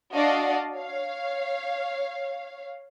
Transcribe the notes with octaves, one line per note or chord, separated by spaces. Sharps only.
D4 F#4 D5 D#5 F5 A5
C#5 F5